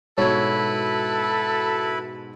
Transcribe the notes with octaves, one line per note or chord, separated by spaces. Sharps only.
G#2 B2 E4 A4 B4 C#5 B5